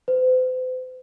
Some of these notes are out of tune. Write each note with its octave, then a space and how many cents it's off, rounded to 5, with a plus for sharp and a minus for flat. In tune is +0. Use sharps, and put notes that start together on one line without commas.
C5 -45